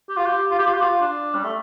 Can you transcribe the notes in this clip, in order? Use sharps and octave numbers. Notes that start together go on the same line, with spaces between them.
G4
F4
G4
F4
G4
F4
G4
F4
D4
G3
A3